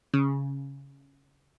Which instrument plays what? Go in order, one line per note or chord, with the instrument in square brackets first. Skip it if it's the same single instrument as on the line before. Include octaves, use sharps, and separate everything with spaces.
[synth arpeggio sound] C#3